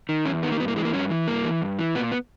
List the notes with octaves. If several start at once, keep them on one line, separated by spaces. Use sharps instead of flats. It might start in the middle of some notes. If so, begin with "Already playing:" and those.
D#3
E2 C#4
D#3 B3
A#3
G2 B3
A#3
E3 G#3
A#3
G2 C#4
E3
G2 A#3
E3
G2
E3
A#2 B3
B3